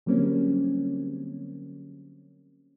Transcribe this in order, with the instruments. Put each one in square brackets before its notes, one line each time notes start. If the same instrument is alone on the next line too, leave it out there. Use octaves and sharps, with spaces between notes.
[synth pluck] D3 F#3 G3 A#3 C4 C#4